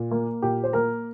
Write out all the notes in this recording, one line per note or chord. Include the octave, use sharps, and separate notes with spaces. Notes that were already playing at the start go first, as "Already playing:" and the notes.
Already playing: A#2
A#3
A#2 G4
C5
A#3 A#4